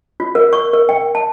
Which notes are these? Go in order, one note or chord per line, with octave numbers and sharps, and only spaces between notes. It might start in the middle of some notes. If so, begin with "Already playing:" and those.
F4
A#4
C#6
A#4
G5
A5